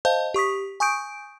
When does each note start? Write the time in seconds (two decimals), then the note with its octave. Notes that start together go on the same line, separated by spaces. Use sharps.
0.05 C5 D#5 F5 A5 G6
0.34 G4 C#6 D#6 B6
0.80 G#5 C#6 D#6 G6 D7